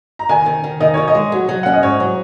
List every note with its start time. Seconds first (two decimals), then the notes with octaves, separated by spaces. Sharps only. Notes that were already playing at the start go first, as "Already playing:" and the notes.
0.19 A#5
0.29 D#3 G#5
0.46 D#3
0.64 D#3
0.80 D#3 D#5
0.94 D#3 C#5
1.08 D#5
1.15 G#3
1.32 F#3
1.49 F#3
1.63 C#4 F#5
1.73 D#5
1.83 G#2 C#5
2.00 F#3